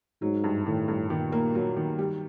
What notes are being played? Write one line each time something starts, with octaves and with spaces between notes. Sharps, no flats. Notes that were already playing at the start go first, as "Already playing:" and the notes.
G#2 F#3
G2
A2 D#3
G2
A#2 D#3
A#3
F#3
D#3
G3